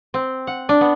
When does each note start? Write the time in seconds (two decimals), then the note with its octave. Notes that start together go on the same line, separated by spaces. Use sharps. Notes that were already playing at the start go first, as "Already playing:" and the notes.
0.14 C4
0.47 F#5
0.69 D4
0.81 B3